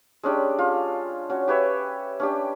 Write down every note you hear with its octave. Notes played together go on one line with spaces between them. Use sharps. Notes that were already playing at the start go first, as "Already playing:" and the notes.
G#3 C#4 D4 G4
F4
C#4 F#4
G4 B4 C#5 E5
C#4 D4 G4